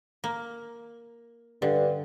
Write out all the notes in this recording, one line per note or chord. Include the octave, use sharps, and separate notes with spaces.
A#3
G2 D3